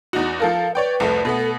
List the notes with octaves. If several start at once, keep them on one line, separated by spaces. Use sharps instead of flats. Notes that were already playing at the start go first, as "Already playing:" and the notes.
E2 D#4 F#4
F3 A4 A#4 F5
B4 C#5 D5 G5
C2 F2 A3
B2 A3 B3
A4